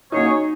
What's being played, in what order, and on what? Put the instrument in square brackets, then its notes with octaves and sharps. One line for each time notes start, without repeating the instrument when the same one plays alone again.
[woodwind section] F#3 A#3 C#4 G#4 C#5 [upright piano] D#4